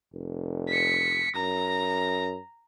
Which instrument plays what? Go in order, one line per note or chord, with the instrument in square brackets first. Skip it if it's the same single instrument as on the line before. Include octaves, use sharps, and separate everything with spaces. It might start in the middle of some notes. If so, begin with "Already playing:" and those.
[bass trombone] F1
[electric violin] B6 C#7
[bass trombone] F#2 [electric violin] A#5 A#6